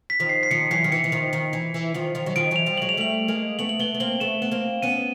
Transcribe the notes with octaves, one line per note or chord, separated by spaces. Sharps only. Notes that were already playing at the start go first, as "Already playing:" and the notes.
B6
D#3 F3
C7
C7
D#3 F3 C#7
E3 F#3 C7
D#3
E3 C#7
E3
D#3 F3
D#3
E3
E3
D#3 F3
D#3 F3
F#3
D#3 F3 D7
E3 F#3 F7
F3 G3
F#3 G#3 F#7
F7
G3 A3 F#7
G#3 A#3
A3 B3 F#7
F#7
A3 B3 G7
B3
A#3 C4 F#7
A3 B3 E7
B3
A#3 C4
B3 C#4 D#7